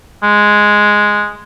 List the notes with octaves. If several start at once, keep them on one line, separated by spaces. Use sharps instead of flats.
G#3